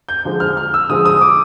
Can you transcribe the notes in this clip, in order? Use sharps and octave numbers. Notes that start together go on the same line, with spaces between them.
G6
D3 F3 G#3
F6
F6
E6
D3 F3 G#3 D#6
D#6
D6